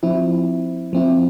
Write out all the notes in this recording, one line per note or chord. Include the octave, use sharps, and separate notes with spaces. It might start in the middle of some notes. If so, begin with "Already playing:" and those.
F3 C4 E4
F3 C4 E4